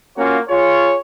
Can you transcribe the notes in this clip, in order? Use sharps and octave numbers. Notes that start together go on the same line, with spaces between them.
A#3 C#4 F4 F#4 C#5
F4 G#4 C#5